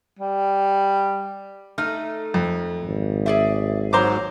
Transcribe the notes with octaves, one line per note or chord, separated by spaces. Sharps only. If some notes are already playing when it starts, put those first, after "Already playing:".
G3
A3 D#4 F6
F2
G#1
G#4 D5 E5
G#2 F#3 C5 A#5 D6